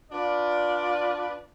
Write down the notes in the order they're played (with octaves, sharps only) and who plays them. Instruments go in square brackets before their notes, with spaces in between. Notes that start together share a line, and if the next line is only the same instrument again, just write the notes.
[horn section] D4 F4 B4 D5